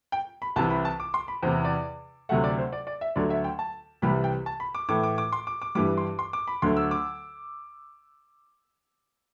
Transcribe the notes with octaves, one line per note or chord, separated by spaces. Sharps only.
G5
B5
C2 C3 E3 A5
B5
A5
D6
C6
B5
E2 C3 E3 C5
D5
D2 C3 F#3 A3 F#5
D5
C5
D5
D5
E5
D2 D3 F#3 A3 D5
E5
G5
A5
C2 C3 E3 G3 B5
G5
A5
B5
D6
A2 E3 A3 D6
D6
D6
C6
D6
D6
G2 E3 G3 D6
C6
C6
D6
B5
D2 D3 F#3 A3 C6
E6
D6